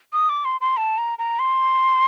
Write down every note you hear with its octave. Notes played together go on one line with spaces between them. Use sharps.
D#6
D6
C6
C6
A5
A#5
A#5
C6